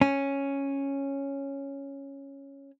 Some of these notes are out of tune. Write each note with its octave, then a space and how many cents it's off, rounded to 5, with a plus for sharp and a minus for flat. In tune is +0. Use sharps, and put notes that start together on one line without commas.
C#4 -5